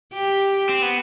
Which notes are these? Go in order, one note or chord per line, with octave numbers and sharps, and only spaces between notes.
G4
C4
B3